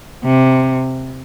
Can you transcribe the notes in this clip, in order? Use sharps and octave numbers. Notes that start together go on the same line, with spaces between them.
C3